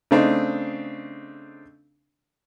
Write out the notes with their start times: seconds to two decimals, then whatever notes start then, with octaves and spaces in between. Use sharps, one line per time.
0.11 C#3 A3 C4 D4 D#4